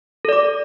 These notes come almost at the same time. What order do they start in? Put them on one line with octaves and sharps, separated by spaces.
A4 D5 D6